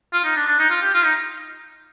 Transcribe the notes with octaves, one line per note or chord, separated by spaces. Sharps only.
F4
D#4
D4
D4
D#4
F4
G4
F4
D#4